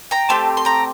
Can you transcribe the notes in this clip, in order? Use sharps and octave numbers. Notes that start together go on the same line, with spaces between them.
G5 A#5
A3 C4 G4 A5 C6
C6
G5 A#5